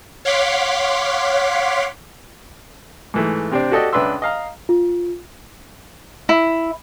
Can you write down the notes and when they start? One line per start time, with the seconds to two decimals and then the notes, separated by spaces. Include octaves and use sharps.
0.25 C#5 F5 F#5 C6 D6 B6
3.14 G#2 E3 A3
3.51 C3 C4 D4
3.71 F#4 G4 A4 D5 D#5
3.93 C#2 D4 B4 E5 C6 E6
4.22 D#5 F5 A#5
4.69 F4
6.29 E4